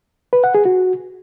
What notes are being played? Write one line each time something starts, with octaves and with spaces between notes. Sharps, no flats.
B4
F#5
G#4
F#4